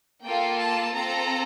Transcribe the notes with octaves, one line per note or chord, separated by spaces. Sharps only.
A#3 F4 A4 G5
A5
C4 F4 A4 A#5